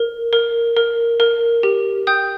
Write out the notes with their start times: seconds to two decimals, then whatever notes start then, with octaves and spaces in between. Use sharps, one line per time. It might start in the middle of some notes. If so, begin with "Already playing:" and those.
Already playing: A#4
0.33 A#4
0.77 A#4
1.20 A#4
1.63 G4
2.07 G5 D#6 G6